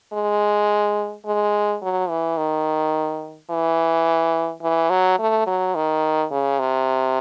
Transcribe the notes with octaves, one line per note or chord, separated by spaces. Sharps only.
G#3
G#3
F#3
E3
D#3
E3
E3
F#3
A3
F#3
D#3
C#3
C3